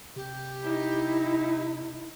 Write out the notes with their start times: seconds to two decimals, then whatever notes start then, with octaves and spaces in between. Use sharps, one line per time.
0.16 C3 G4
0.62 D#4 E4